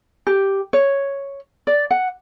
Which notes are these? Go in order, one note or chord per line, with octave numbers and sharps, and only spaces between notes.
G4
C#5
D5
F#5